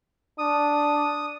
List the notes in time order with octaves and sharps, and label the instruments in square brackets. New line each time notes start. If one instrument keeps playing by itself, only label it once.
[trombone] D4 [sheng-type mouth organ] D#6